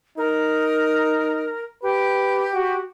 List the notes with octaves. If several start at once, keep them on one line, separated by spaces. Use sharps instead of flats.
D#4 A#4
G4 B4
F#4